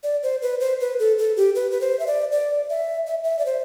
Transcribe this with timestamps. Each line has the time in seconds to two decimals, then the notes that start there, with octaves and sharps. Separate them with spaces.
0.03 D5
0.23 C5
0.42 B4
0.60 C5
0.80 B4
0.99 A4
1.18 A4
1.37 G4
1.55 B4
1.71 B4
1.81 C5
1.99 E5
2.07 D5
2.32 D5
2.70 E5
3.07 E5
3.24 E5
3.39 D5
3.46 C5